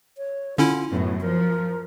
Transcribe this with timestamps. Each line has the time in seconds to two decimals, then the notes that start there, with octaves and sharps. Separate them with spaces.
0.18 C#5
0.58 D3 C#4 E4 F4
0.91 F#2 A2 B3
1.21 F3 A#4